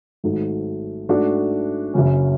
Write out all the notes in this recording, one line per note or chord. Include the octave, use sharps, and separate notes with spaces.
G#1 G#2 F#3 A3
G#2 F#3 A3 D4 F#4
F#1 F#2 C#3 F#3 C#4